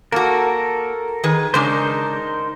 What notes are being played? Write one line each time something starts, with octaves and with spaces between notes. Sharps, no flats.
A#3 F#4 A4 A#4
D#3 G#4 B4
C#3 G#3 D4 D#4 A#4 C5